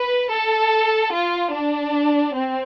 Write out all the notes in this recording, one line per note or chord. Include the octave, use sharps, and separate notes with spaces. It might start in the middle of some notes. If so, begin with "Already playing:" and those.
Already playing: B4
A4
F4
D4
C4